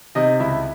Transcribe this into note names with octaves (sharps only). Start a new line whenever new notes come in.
C3 D#4 D#5
C#2 E4 E5